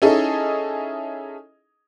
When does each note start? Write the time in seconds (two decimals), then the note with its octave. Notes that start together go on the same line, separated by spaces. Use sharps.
0.02 C#4 D#4 E4 G#4 A4 D#5